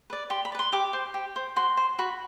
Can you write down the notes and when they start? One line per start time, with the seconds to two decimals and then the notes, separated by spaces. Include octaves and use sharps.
0.10 B4 D5
0.30 G4 C6
0.45 B5
0.52 D5
0.55 B4 C6
0.72 G4 D6
0.93 C5
1.14 G4
1.36 C5
1.56 F#4 C6
1.77 C5
1.99 F#4 B5